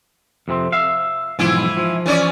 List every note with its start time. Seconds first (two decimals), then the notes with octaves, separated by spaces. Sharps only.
0.48 F2 C3 C4
0.72 E5 F5
1.39 B1 G#2 E3 F3 E4
1.77 F3
2.06 E3 C#4 D5